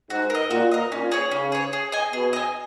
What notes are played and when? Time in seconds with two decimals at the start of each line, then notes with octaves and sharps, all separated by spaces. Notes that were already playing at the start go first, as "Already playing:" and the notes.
0.10 G#2 F#4
0.30 A#4 D#5
0.50 A#2 F#4
0.71 A#4 D#5
0.91 A#2 C#4
1.12 G#4 C#5
1.31 C#3 C#4
1.52 G#4 C#5
1.73 G#4
1.92 D#5 G#5
2.13 B2 G#4
2.33 D#5 G#5